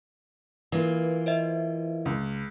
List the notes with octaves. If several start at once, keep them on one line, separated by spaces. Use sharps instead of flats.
E3 A#3 F4 B4
C5 D#5 E5
C#2